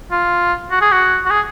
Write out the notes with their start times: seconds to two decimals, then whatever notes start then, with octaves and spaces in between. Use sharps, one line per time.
0.11 F4
0.71 F#4
0.81 G#4
0.92 F#4
1.26 F#4
1.30 G#4